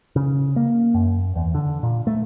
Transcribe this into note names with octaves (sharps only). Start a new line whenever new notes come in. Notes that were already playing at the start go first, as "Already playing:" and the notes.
C#3
A#3
F#2
E2
D3
A#2
A3